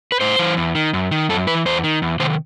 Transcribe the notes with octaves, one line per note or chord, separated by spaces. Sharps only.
B4
A2 C5
E3
E2
D#3
F#2
D#3
F#2 A4
E3 B4
E2 C5
D#3
E2
C3 D#3 C5